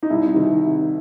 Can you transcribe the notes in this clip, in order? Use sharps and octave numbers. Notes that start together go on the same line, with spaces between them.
D#4
C2 E4
C3 D#3